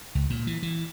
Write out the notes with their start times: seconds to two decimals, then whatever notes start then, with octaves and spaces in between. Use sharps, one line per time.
0.15 C#2
0.30 A#2
0.47 E3
0.63 E3